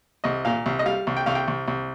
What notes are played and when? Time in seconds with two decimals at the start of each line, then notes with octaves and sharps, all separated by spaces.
0.24 C2 D#5
0.45 A#2 F5
0.66 C2
0.79 D#5
0.86 G3 F5
1.07 C2
1.17 G5
1.26 C2 F5
1.35 G5
1.48 C2
1.68 C2